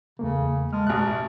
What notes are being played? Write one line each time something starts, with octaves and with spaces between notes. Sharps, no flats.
E2 C#3 A3 A#3
G#3 A5 D#6 F6
A1 B2 F#6